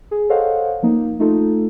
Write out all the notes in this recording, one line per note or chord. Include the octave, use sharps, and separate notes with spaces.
G#4
A4 C5 C#5 D#5 F5 F#5
F3 A#3 D#4
A3 D#4 F4 A4